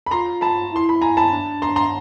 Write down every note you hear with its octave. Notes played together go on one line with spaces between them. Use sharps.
B5
F4 A#5 C6
A5 B5
E4 C6
B5
G#5 A#5
A5 B5
D4
A#5 C6
A#5 C6